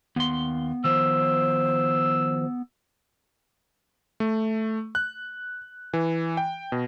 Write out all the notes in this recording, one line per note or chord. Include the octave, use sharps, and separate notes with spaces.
D#2 B3 C6
D#3 F3 C5 E6
A3
F#6
E3
G5
B2